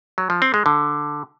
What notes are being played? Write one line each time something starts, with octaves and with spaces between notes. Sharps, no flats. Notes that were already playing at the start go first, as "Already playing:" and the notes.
F#3
F3
C4
G#3
D3